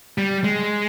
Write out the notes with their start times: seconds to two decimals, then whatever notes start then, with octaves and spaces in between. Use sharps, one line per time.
0.18 G3
0.44 G#3